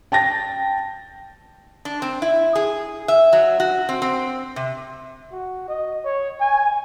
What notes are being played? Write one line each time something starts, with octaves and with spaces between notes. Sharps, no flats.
G5 A5 A6 A#6
D4
C4
E4
G#4
E5
F#3
F#4
C4
C4
C3
F#4
D#5
C#5
G#5